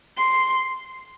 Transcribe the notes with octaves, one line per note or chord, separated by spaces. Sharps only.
C6